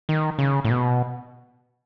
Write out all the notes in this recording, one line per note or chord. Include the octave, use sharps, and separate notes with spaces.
D#3
C#3
A2
B2